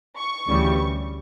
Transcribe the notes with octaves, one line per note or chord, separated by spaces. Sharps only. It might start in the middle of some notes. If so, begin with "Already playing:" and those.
C#6
D2 C#3 E3 G3